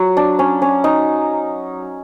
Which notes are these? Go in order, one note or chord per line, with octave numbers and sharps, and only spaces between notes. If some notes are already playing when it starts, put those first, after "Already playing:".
Already playing: F#3
D4
C#4
C#4
D#4